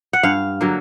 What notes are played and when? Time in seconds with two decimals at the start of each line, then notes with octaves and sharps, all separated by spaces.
0.13 F#5
0.23 G2 F5
0.61 D3 F#3 A#3